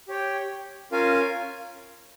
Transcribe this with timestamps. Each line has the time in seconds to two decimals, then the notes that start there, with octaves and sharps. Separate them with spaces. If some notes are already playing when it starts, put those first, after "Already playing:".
0.08 G4 C#5 G5
0.92 C#4 F4 A#4 F5 G#5